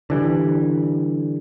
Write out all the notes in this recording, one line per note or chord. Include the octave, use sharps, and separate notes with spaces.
D3 E3 G3